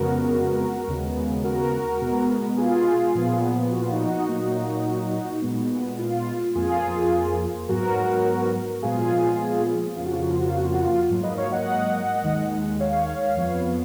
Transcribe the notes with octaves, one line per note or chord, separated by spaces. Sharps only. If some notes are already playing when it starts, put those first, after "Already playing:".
Already playing: F2 C#3 G#3 B3 F#4 A#4
D#2 C#3 G#3 B3
F#4 A#4
B2 G#3 B3
F4 G#4
A#2 F3 B3
F#4
F4
D#4 F#4
A#2 F#3 A#3
A#2 G#3 B3
F4
F2 F3 A#3 F4 G#4
G#2 F#3 B3 F#4 A#4
A#2 F3 G#3 B3 F4 G#4
F2 C#3 F3 A#3 F4
F#4
F4
F#4
F4
F#4
F4
F#4
F4
F#4
F4
G#2 F#3 A#3
B4 D#5
C#5 F5
D#5 F#5
D#2 D#3 G#3
C#5 F5
F2 F3 B3